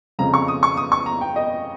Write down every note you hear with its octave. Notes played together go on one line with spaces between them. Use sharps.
F2 C#3 F3 A#5
C#6
D#6
C#6
D#6
C#6
A#5
G5
D#5